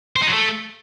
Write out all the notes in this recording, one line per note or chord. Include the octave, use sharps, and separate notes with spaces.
C5
D#4
F#3
A3